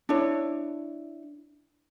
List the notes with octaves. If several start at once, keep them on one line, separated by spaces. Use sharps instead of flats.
D4 E4 C#5